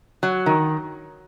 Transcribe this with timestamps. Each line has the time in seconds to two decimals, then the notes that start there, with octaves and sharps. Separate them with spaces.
0.23 F#3
0.46 D#3